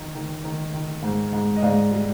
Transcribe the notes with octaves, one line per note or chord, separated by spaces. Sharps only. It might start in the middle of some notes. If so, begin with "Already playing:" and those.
Already playing: D#3
D#3
D#3
D#3
G#2
G#2
D#5
G#2 D5 F5
G3